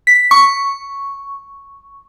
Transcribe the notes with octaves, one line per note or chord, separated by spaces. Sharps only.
B6
C#6